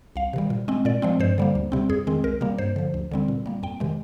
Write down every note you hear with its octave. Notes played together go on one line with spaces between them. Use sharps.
C2 F5
C3 D#3 G3
A#2
G#3 C4
A#2 D5
F3 G#3 C4
G2 C5
D3 G3 A#3
D2
C3 G3 C4
F2 G#4
D#3 G#3 C4
C2 A#4
C3 G3 A#3
G2 C5
D3 F3
D2
D3 G3 C4
A#2
G3 A#3
F2 G5
C3 D#3 G#3